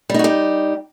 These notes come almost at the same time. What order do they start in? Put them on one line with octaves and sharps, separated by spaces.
G3 D#4 F#4 G4